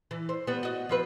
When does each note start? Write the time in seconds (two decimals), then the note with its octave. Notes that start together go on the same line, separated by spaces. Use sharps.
0.11 E3
0.29 C5
0.47 G3 B3
0.63 F#4 D#5
0.89 F3 C4 B4